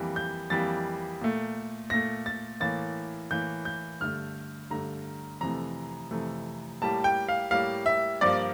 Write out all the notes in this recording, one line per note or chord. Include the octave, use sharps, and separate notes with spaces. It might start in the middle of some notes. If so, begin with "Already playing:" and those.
Already playing: F2 E3 G3 A#3
G6
F2 E3 G3 A#3 A6
A#2 A3
A#2 A3 A#6
A6
A2 E3 A#3 A6
A2 E3 A#3 G6
G6
G2 D3 A3 F6
G2 D3 A3 A#5
F2 C3 E3 A3 A#5
F2 C3 E3 A3
A2 G3 A#3 A5
G5
F5
A2 G3 A#3 F5
E5
G2 F3 A#3 D5